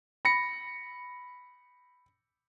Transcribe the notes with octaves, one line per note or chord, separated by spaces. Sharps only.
B5 A#6 C#7